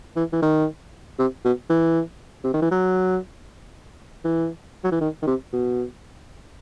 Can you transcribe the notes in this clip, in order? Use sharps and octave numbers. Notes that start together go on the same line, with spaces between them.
E3
E3
D#3
C3
B2
E3
C3
D#3
E3
F#3
E3
F#3
E3
D#3
D#3
C3
B2